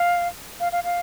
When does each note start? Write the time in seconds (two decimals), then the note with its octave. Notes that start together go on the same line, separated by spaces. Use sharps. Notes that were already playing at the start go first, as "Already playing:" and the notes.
Already playing: F5
0.60 F5
0.72 F5
0.84 F5